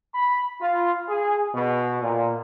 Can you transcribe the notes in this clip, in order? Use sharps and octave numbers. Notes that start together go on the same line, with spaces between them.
B5
F4
G#4
B2
A#2